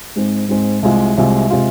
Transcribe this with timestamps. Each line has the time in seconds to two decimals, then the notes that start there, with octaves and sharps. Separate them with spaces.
0.16 G#2 G#3 C4
0.49 G#2 G#3 C4
0.83 C2 C3 G#3 F4
1.17 C2 C3 G#3 F4
1.50 C3 G#3 F4